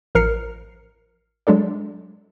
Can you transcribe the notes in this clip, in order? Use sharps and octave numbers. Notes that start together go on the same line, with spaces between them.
A1 F3 A#4 F6 C7 C#7
F#3 G#3 D4 A4 D5